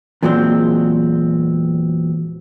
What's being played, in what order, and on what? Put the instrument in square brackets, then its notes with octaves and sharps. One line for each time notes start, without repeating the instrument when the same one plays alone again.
[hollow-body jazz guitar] E2 A#2 F#3 G#3 C4 C5